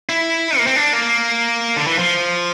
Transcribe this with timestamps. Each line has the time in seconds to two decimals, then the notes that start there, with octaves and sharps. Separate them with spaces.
0.09 E4
0.58 A#3
0.67 C4
0.76 D4
0.93 A#3
1.77 D3
1.87 E3
1.98 F3